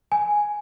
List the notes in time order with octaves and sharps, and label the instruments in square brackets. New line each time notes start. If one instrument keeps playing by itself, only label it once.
[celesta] G#5